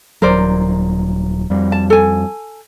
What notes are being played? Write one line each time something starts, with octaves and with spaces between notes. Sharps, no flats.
D#1 F#3 A#4 C5 D5
F2 G3
A5
A4 G#5